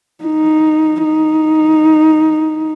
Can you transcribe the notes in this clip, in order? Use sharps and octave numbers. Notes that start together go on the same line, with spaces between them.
D#4
D#4